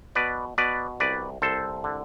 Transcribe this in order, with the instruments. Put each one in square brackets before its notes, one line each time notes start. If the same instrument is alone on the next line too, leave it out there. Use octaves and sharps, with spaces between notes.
[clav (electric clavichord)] B2 B4 D5
B2 B4 D5
C2 B4 D5
C2 A4 C5
D3